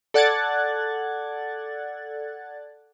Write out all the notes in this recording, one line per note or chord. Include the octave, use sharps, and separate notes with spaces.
A4 D5 F#5 F#6 G#6 A6